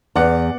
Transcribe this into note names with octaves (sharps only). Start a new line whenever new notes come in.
E2 D5 F#5